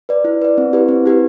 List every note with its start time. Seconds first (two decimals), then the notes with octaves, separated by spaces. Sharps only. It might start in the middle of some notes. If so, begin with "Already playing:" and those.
0.09 B4 D5
0.24 E4
0.42 B4 D5
0.58 C4
0.73 E4 G4 B4
0.89 C4
1.06 E4 G4 B4